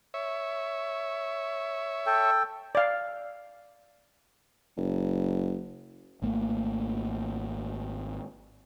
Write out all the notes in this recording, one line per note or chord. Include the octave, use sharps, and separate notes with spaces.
C#5 E5
A4 G5
D5 F5
F#1
G#1 A3 A#3